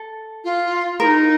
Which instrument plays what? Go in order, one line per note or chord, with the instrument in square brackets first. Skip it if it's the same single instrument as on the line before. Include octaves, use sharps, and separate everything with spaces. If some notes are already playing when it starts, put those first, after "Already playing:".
Already playing: [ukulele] A4
[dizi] F4
[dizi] E4 [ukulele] A#4
[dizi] D#4